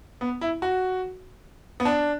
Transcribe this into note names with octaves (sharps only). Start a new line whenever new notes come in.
B3
E4
F#4
B3
D4